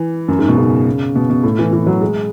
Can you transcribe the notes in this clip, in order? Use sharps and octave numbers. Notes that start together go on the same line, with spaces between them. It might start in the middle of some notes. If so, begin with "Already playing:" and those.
Already playing: E3
F#2
G#2
B2
C#3
B2
B2
A2
E3
E3
F#3
G#3